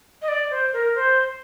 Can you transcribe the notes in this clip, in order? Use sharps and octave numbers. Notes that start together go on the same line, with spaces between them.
D#5
D5
C5
A#4
C5